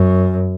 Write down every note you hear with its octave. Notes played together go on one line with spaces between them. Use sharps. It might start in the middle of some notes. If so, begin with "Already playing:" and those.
Already playing: F#2